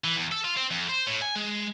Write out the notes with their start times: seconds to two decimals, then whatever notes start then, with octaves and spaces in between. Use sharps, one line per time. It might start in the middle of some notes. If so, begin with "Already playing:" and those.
0.04 E3
0.16 E2
0.32 A4
0.44 F4
0.57 C4
0.71 F2
0.89 C5
1.07 A2
1.22 G#5
1.35 G#3